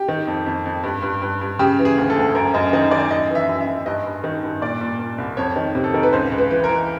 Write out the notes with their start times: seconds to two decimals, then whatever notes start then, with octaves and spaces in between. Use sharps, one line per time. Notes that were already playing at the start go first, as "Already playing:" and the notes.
Already playing: G4
0.08 D#3
0.27 F2
0.46 F2
0.65 F2
0.83 G2
1.02 G2
1.22 G2
1.41 G2
1.59 C#3 G4
1.79 E3
1.85 G#4
1.98 D2
2.10 A4
2.16 D2
2.35 F#2 A#4
2.54 F#2 D#5
2.73 D#3 D#5
2.91 D#3 D5
3.11 F#2 D#5
3.30 E3
3.35 E5
3.49 F#2
3.61 E5
3.67 F#2
3.86 G2 D#5
4.06 G2
4.24 D#3
4.43 G2
4.62 A#2 D5
4.81 A#2
4.99 A#2
5.18 C2
5.37 F2 C#5
5.56 D#3
5.75 C3
5.84 A4
5.94 D#3 A#4
6.03 B4
6.13 C#2 C5
6.32 C#2
6.38 B4
6.51 E3
6.64 A#4
6.69 E3